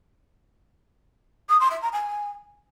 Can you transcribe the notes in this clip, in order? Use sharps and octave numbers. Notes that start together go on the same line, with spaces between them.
D#6
C6
E5
A#5
G#5